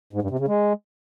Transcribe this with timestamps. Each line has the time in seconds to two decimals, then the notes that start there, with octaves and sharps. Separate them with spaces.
0.13 G#2
0.22 G2
0.30 C3
0.39 C#3
0.48 G#3